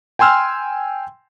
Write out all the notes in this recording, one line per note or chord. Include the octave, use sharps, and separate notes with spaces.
G5 G#5 C6 E6 F6